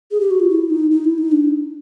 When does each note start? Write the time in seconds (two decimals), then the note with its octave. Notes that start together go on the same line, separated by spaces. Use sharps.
0.11 G#4
0.20 G4
0.31 F#4
0.40 F4
0.49 E4
0.70 D#4
0.91 D#4
1.05 E4
1.18 D#4
1.32 D4